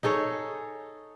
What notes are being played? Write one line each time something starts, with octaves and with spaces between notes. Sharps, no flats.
D#4 G#4 A4 C#5